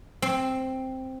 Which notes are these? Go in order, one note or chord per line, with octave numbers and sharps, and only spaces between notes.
C4